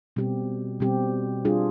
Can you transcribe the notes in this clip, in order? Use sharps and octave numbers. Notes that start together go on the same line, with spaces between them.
B2 G3 C4 G4
B2 G3 C4 G4
G3 D4 F4 G#4